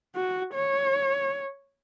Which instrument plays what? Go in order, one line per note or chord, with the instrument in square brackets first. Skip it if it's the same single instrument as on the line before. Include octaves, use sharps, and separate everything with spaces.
[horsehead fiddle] F#4
C#5